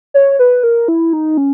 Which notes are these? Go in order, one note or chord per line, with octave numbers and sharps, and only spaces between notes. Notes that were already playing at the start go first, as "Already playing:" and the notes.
C#5
B4
A#4
E4
D#4
C#4